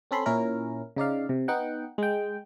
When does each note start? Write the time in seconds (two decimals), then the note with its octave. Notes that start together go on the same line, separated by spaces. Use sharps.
0.11 C4 C#4 A4 B5 C6
0.26 A#2 C#4 E4 A#4
0.96 C#3 D#4 D5 F5
1.29 C3
1.48 B3 D#4 F#5 G5
1.98 G#3 G5